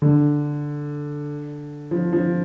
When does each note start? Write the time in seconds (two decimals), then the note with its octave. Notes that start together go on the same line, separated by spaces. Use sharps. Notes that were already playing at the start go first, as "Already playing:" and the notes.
0.02 D3
1.91 F3
2.13 F3